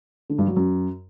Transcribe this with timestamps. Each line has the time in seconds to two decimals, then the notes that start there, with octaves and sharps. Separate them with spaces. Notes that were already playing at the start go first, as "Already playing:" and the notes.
0.30 D3
0.38 G2
0.47 F#3
0.56 F#2